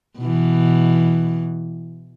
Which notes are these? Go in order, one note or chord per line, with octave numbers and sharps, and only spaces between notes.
B2 E3